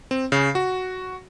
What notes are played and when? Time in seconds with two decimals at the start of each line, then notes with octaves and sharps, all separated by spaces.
0.11 C4
0.32 C#3
0.55 F#4